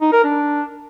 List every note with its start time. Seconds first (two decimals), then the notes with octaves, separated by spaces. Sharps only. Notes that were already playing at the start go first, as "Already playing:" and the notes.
0.01 D#4
0.13 A#4
0.24 D4